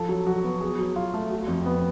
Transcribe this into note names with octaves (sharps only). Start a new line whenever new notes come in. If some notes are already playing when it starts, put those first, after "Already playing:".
Already playing: F3 A4
F#3
F#4
B3
G#4
F#3
F4
A3
F#4
F2
B3